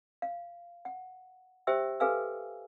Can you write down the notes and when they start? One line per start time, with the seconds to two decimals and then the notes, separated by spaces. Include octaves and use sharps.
0.22 F5
0.85 F#5
1.67 G4 C5 E5 G5 E6
2.00 G4 A4 B4 F5 G#5 E6